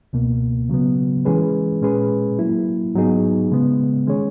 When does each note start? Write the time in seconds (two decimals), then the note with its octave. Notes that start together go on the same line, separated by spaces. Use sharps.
0.13 C#2 B2 A#3
0.69 C#3 F#3 B3
1.25 E3 G#3 C#4 G#4 B4
1.81 A#2 G#3 C#4 G#4 B4
2.39 F#3 A#3 E4
2.95 G#2 F#3 B3 D#4 G#4
3.52 C#3 G#3 B3
4.07 D#3 G#3 C#4 G#4 C#5